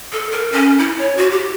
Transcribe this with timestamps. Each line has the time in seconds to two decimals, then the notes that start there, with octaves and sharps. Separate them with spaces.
0.12 A4
0.32 A#4
0.52 C#4
0.79 E4
0.98 C#5
1.17 F#4
1.31 G4